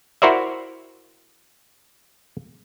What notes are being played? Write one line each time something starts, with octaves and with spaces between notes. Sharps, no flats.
E4 F#4 A#4 C5 D5 E5